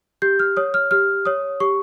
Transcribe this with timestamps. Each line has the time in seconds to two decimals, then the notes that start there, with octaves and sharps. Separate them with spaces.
0.22 G4 G6
0.39 F6
0.57 C#5 D#6
0.74 F6
0.91 G4 F6
1.25 C#5 D#6
1.60 G4 C#6